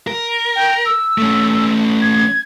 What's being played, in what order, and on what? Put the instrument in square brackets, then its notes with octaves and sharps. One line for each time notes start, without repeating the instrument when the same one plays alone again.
[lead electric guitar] A#4
[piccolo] G5
E6
[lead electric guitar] A3 C#4
[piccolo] G#6